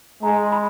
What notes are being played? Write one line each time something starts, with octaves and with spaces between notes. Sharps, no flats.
G#3 A#5
C6
B5